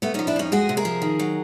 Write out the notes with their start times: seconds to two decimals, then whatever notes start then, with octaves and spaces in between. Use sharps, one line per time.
0.02 C3 A3 B3
0.14 F3 C#4 D#4
0.27 D4 E4
0.36 F2 C#4 D#4
0.52 G#3 F#4 G#4
0.69 C3
0.77 G#4 A#4
0.85 F3
1.02 D#3
1.19 F#3